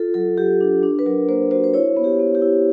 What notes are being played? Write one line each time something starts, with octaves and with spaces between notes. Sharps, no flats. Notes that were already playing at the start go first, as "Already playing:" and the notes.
Already playing: F4 A4
F#3 A4
F#3 G4
D4
D4
B4
F#3 A#4
A#3 C5
F#4 C5
C5
E4 C#5
B3
G4
B3
G4
E4